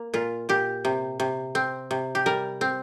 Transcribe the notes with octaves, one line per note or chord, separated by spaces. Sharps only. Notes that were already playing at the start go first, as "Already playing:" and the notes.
Already playing: A#3
A#2 F4
A#2 G4
C3
C3
C4
C3
G4
G3 A#4
C4